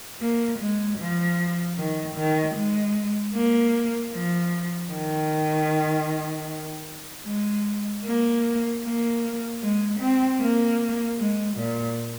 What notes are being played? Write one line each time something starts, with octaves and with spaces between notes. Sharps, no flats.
A#3
G#3
F3
D#3
D#3
G#3
A#3
F3
D#3
G#3
A#3
A#3
G#3
C4
A#3
G#3
A#2